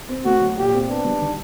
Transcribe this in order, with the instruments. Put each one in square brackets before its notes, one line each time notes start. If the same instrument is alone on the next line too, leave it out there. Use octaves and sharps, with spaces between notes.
[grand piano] C4
[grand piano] A3 [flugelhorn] F#4
[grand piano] F#3
[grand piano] A#2 [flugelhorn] G4
[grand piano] C4
[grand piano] B3 [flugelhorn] D4
[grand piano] G3
D#3